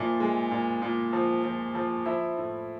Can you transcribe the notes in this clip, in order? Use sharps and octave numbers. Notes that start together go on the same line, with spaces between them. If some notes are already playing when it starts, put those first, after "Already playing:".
Already playing: A#2 F3 E4
G#3
A#2
A#2
F3
F3
F3
F3 E4 E5
A2